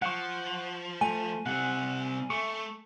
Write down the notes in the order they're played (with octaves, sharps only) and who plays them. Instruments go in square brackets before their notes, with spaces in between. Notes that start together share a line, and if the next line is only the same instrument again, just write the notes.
[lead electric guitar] F3 [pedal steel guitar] F#5 C#6
[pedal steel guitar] A3 [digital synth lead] G#5
[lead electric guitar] C3 G3 [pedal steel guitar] F#5
[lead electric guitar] A3 [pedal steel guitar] C#6